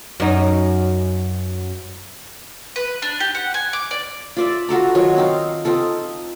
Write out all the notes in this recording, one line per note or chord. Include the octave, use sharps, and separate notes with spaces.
F#2 D#4
B4
D4
G4
F#5
G#5
D6
D5
F4 D5 E5
F4 F#4 A4 A#5
D#3 F#3 F4 C#5
C4 D#4 F5
C4 D#4 F4 A4